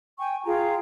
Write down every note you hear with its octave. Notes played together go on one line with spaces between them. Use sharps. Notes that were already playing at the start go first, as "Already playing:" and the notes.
G5 G#5 C#6
F4 G#4 G5 A#5